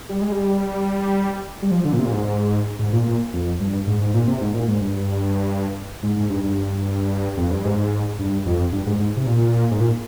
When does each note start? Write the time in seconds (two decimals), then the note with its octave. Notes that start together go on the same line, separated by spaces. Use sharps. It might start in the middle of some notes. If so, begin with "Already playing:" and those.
0.09 G3
0.21 G#3
0.32 G3
1.62 G3
1.71 F3
1.85 D3
1.93 A#2
1.99 C3
2.05 A#2
2.12 G#2
2.79 G#2
2.93 A#2
3.07 A#2
3.33 F2
3.60 G2
3.87 G#2
4.00 G#2
4.14 A#2
4.27 C3
4.41 G#2
4.54 A#2
4.68 G#2
4.81 G2
6.03 G#2
6.16 G#2
6.30 G2
6.43 G2
7.37 F2
7.51 G2
7.65 G#2
8.19 G2
8.46 F2
8.72 G2
8.86 G#2
8.99 G#2
9.17 C3
9.27 A#2
9.71 G#2
9.80 A#2